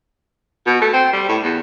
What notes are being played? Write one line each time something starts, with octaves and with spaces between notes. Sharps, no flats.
B2
A3
C4
G3
A2
E2